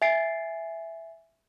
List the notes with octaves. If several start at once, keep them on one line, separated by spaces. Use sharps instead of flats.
E5 G#5 A6 C7 D7